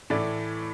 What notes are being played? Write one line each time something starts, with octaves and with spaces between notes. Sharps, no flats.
A2 E3 A3 D5